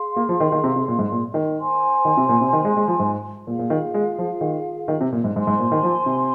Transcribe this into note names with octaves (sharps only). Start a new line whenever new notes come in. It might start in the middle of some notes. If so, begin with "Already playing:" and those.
Already playing: G#4 F5 C6
A#3
F3
D#3
D#3
C3
C3
A#2
G#2
A#2
D#3
C5 G#5 C6
D#3
C3
A#2
C3
D#3
G#3
G#3
F3
G#2
A#2 F4 G#4 F5
A#2
D#3
G#3
F3
D#3
D#3
C3
A#2
G#2
G#2 C5 G#5 C6
G#2
A#2
D#3
F3
C3